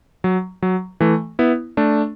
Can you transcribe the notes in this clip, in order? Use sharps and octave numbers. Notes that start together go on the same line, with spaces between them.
F#3
F#3
E3 A3
B3 E4
A3 D4